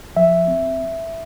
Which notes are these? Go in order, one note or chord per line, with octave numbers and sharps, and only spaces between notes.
F3 E5
C4